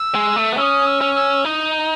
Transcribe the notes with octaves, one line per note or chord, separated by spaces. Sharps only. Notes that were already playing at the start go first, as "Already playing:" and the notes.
Already playing: E6
G#3
A3
B3
C#4 D#6 E6
E6
C#4
E6
D#4